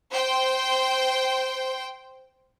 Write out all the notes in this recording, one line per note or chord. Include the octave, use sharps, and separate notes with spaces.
C5 G5